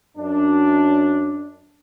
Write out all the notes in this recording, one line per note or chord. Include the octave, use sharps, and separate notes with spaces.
F#2 D4